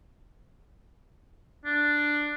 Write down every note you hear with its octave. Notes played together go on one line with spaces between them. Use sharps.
D4